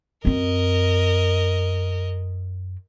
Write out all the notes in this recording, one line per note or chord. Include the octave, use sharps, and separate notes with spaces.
F#2 C4 A#4 D#5